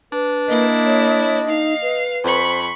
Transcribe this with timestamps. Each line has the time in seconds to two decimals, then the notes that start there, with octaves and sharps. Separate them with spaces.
0.13 D4 B4
0.48 A#3 E4 D#5
0.85 C#5
1.48 D#4 F5
1.82 B4
2.24 F2 C5 B5 C#6